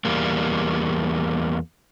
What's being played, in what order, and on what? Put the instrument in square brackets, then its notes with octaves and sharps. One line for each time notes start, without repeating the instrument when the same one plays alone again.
[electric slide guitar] E2 G3 A#3